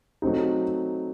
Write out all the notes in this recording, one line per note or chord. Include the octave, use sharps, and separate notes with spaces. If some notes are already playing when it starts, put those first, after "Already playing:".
F#3 A3 C4 D#4